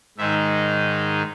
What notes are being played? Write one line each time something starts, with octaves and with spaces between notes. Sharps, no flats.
G#2 D#3 G#3 D#4 E5